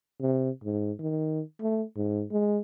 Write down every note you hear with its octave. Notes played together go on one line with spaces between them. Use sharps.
C3
G#2
D#3
A3
G#2
G#3